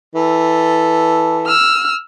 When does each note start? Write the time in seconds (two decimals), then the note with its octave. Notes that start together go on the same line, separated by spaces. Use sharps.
0.16 E3 A4
1.46 E6 F6